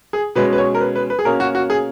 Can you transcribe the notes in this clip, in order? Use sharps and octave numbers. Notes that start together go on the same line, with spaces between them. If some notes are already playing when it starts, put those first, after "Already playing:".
G#4
B2 G#3 C#4 B4
B4
C#5
A#4
B4
B4
B4
G#4
B2 A#3 C#4 A#4
F#4
F#4
G#4